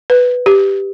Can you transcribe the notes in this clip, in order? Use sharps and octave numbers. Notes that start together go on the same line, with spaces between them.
B4
G4